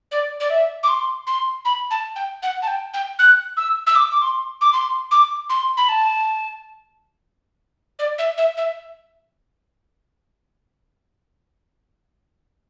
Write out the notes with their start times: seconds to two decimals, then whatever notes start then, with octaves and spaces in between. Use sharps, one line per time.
0.12 D5
0.40 D5
0.50 E5
0.83 D6
0.88 C6
1.27 C6
1.65 B5
1.91 A5
2.16 G5
2.43 F#5
2.62 A5
2.67 G5
2.94 G5
3.19 F#6
3.57 E6
3.87 E6
3.95 D6
4.11 D6
4.22 C6
4.61 D6
4.73 C6
5.11 D6
5.50 C6
5.77 B5
5.89 A5
7.99 D5
8.19 E5
8.38 E5
8.57 E5